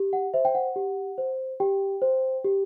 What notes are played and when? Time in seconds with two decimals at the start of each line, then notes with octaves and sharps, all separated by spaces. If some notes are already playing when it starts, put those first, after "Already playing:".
Already playing: G4
0.13 F#5
0.34 C5 E5
0.45 G5
0.55 F#5
0.76 G4
1.18 C5
1.60 G4 G5
2.02 C5
2.44 G4